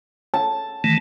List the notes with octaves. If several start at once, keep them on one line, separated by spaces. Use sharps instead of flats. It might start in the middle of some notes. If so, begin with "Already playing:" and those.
A5
D#3 E3 A3